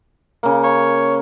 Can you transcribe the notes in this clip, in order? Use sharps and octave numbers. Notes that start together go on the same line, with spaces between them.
C#3 A#3
C#5